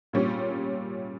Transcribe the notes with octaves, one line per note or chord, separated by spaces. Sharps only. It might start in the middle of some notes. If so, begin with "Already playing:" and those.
A#2 G3 C#4